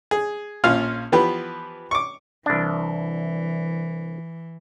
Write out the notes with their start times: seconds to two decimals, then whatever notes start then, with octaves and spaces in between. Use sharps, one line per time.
0.11 G#4
0.64 A#1 C#4 F4 F5
1.12 E3 F3 B3 G4 B4
1.91 C#6 D6
2.46 C2 E3 D4